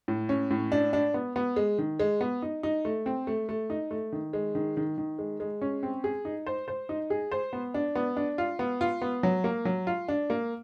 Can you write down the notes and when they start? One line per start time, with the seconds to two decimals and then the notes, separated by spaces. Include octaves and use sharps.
0.08 A2
0.29 C#4
0.51 A2
0.72 D4
0.93 D4
1.14 B3
1.36 B3
1.56 G#3
1.78 D#3
2.00 G#3
2.21 B3
2.42 D#4
2.63 D#4
2.85 A3
3.06 C4
3.27 A3
3.49 A3
3.70 D#4
3.91 A3
4.12 D#3
4.33 G#3
4.55 D#3
4.77 D#3
4.98 D#3
5.19 G#3
5.40 G#3
5.62 C#4
5.83 C4
6.04 G#4
6.25 D#4
6.46 C5
6.68 C5
6.89 D#4
7.10 G#4
7.31 C5
7.53 B3
7.74 D4
7.95 B3
8.17 D4
8.38 F4
8.59 B3
8.81 F4
9.02 B3
9.23 F#3
9.44 A#3
9.65 F#3
9.87 F4
10.08 D4
10.30 A#3